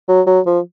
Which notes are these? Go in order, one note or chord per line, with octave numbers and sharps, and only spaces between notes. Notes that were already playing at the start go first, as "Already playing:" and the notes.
F#3
F#3
F3